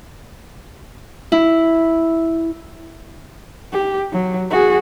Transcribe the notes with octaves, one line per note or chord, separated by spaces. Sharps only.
E4
G4
F#3
F#4 G#4